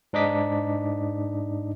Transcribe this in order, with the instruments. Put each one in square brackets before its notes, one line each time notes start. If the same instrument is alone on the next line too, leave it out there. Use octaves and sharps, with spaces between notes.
[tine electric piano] G#2 D4 D#4 D#5 D6 B6